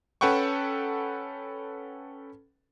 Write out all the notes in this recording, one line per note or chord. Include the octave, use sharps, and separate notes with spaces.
C#4 A4 B4 F#5 G5 C#6